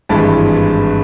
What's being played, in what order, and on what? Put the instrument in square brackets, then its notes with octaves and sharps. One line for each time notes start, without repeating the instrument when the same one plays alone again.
[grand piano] G#1 G2 E3 G#3 A5 B5